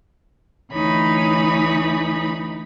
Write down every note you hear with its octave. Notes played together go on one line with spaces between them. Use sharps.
D2 E3 D#4 C#5 B5